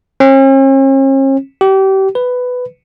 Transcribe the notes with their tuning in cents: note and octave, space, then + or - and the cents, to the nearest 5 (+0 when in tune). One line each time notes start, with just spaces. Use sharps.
C#4 -45
G4 -30
B4 +10